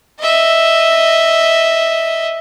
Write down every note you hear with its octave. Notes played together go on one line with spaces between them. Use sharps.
D#5 E5